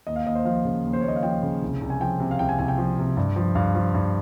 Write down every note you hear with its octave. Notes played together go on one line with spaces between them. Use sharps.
D#2 D#5
F5
D#2 D#5
C5
F3 F5
C#3
D#2
C5
C#5
D#2 D#5
F5
F3 G5
C#3
C2
C2
G#5
F3 G5
C3
F5
C2 G5
G#5
C2 G#5
G5
F3
C3
G2
F3
G2 F5
F3
G2